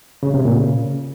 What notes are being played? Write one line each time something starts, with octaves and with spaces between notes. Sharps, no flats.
C#3
C3
A#2
C#3